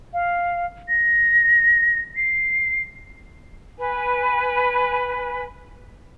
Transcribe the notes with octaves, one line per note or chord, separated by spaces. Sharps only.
F5
A#6
C7
B4 G#5